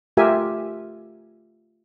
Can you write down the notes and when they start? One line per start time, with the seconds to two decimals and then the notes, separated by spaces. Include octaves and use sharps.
0.17 A3 F4 G4 A#4 E5 G#5